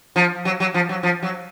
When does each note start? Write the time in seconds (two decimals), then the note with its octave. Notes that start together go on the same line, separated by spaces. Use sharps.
0.16 F3
0.45 F#3
0.60 F#3
0.74 F3
0.89 F#3
1.03 F3
1.23 F#3